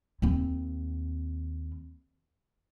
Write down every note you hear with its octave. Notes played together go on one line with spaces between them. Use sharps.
D#2 C4